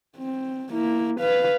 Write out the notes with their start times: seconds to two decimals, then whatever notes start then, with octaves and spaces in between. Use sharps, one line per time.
0.17 C4
0.72 A#3 E4
1.21 B4 F5